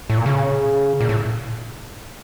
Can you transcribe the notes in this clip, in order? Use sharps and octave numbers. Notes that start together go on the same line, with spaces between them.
A2
A#2
C#3
A#2
A2